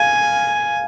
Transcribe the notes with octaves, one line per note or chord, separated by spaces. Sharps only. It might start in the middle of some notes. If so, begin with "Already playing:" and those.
Already playing: F5 G#5